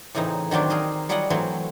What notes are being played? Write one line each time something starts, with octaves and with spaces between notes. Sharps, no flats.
A2 C#3 E3 C4 D#4
D#3 F#3 C4 D4 G4
G#4 A#4 D#5 F5
F#3 G3 F4 G#4 D#5 F#5
E3 F#3 A3 C4